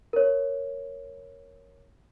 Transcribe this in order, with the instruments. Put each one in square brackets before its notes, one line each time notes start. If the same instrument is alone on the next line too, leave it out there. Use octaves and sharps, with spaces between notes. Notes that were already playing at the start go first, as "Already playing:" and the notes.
[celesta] A#4 C#5